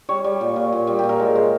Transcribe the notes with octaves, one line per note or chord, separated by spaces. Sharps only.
G3 C#5
G3
A#2
A#2
A#2
G3
A#2 G4
A#4
G#3
G#3